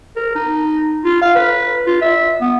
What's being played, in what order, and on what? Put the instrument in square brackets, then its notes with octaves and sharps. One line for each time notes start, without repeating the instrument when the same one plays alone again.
[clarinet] A#4
D#4
F4
F5
B4
F4
E5
B3